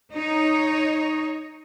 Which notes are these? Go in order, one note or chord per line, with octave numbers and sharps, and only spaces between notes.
D#4 C#5